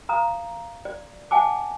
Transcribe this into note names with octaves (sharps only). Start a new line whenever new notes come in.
F5 A#5 D#6
D5
E5 F#5 G#5 A5 D6